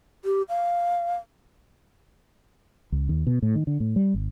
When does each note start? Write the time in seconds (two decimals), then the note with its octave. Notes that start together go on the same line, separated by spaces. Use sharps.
0.25 G4
0.49 F5
2.92 C#2
3.09 D#2
3.27 B2
3.42 A2
3.55 D#3
3.67 D3
3.80 A2
3.96 G3
4.14 G#1